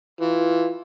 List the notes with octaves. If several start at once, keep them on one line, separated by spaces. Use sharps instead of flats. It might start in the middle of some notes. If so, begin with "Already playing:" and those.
E3 F4